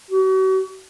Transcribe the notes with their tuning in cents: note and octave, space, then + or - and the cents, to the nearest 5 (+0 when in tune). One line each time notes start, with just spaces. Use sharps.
F#4 +40